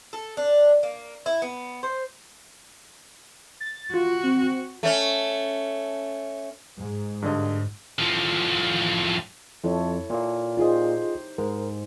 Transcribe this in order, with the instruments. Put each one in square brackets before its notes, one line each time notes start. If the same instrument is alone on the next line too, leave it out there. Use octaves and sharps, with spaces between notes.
[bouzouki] A4
D4
A#3
E4
B3
C5
[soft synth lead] A6
[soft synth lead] F4 [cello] F#4
[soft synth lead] C4
[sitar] A3 C#4
[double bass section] G#2
[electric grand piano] G2 D3 D#5
[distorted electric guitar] A2 F3
[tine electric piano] F2 [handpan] E4 A4 C#5
[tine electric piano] A#2 A#3
[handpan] D#4 G4 C5 [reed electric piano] F4 G#4 D#5
[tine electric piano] G#2 [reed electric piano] A#4